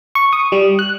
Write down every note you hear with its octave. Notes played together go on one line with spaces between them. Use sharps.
C#6
D#6
G3
F#6